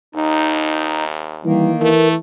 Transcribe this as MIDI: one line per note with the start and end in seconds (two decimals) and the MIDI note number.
0.15 1.56 39
0.15 1.04 63
1.45 1.90 51
1.45 1.73 52
1.45 1.68 55
1.45 1.90 58
1.81 2.16 52
1.81 2.15 57
1.81 2.08 70